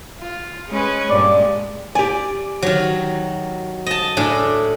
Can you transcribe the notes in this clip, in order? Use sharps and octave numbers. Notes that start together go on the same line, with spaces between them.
F4
G#3 C#4 B4
G2 A#2 G#3 D5
G4 D5 G#5
D#3 F#3
D#5 A5
A2 D4 G#4